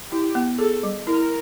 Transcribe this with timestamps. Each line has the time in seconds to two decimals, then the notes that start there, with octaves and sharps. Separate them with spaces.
0.11 E4 G4
0.35 B3
0.59 G#4 A4
0.83 G3
1.07 E4 A#4